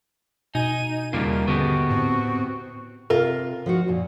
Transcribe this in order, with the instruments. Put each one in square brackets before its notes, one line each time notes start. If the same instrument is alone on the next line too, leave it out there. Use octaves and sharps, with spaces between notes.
[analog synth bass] B2 [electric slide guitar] D#4 [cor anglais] G#5 [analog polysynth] D#7
[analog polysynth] D#2 C#3 [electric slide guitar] G3 A#3 F4 [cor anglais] A#4
[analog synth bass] D3 [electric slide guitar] B3 G4 [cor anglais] F#4
[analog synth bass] A2 [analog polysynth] C4
[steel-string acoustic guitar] C3 [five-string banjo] F4 A#4
[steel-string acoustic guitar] F3 D#4 F#4
F#2 A#2